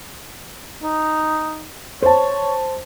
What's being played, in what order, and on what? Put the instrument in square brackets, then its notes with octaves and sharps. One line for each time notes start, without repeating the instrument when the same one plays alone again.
[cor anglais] D#4
[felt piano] C5 A5 [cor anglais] C#5